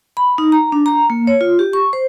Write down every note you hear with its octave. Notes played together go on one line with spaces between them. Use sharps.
B5
D#4
A#5
D4
A#5
A#3
C#5
F4
G4
C#6
C5